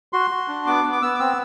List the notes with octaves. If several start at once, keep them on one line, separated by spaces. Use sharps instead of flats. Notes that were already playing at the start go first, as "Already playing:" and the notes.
F#4 C6
F#4
D4
B3 D6
B3
D6
B3 E6
D6
C4 E6